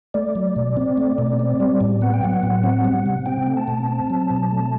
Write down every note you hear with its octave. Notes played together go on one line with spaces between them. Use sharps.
A3 D5
F#3
B2
C4
A3
B2
C4
G3
A2
B3 F#5
G5
F#3 F#5
A2
C4
G3
C3
C4 G5
A3
A5
B2
C4
F#3
B2
A3